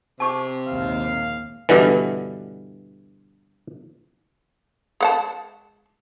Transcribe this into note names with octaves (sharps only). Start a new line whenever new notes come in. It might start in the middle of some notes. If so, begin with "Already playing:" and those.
C3 A5 C#6 D6
A#1 D#2 G#2 F5
G2 B2 D3 E3
G#3 F#5 A5